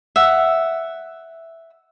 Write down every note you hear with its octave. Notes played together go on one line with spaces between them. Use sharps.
E5 F#5